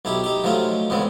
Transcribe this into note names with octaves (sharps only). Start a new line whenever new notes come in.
B1 D#4 E4 G4
D#4 G4
F3 F#3 A3 D#4 F4
E2 G#2 C#3 B3 C4